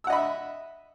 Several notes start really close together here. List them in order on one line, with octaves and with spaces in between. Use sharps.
E6 F#5 D#5 B5 E5